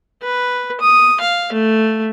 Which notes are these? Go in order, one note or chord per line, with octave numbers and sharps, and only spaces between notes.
B4
D#6
F5
A3